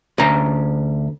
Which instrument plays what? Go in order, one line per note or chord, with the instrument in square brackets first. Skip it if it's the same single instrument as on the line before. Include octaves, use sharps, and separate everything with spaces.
[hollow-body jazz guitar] D2 C#4 A#5